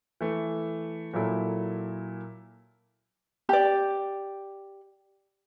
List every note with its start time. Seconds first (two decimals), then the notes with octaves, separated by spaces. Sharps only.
0.21 E3 A3
1.13 A#2 F#3 A#3 E4 A4
3.49 G4 D5